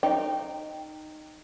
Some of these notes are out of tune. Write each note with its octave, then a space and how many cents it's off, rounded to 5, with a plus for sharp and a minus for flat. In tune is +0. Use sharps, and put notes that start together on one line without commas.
D#4 -15 G5 +0